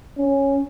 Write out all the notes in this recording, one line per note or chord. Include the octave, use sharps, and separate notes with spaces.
C#4